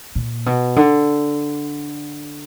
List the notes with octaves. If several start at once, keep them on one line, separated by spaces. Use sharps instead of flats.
A#2
B2
D3